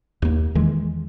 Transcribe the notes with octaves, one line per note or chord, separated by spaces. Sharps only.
D#2 A#3
E2 D#3 E3 G#3